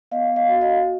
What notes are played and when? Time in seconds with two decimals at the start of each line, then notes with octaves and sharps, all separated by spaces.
0.11 B3 D#5 F5
0.36 D#5 F5
0.48 F#4
0.61 D#5 F5